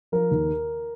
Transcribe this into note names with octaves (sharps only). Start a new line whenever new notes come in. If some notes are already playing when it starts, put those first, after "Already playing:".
F3 A#4
D#2